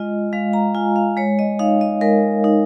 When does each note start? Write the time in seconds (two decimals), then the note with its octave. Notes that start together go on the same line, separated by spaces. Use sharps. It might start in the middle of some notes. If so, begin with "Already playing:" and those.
Already playing: G#3 F4 D#5
0.33 G#3 F5
0.53 A#5
0.75 F4 G#5
0.96 F5
1.17 G#3 C#5
1.39 D#5
1.59 D#4 F5
1.81 D#5
2.01 G#3 A#4
2.44 D#4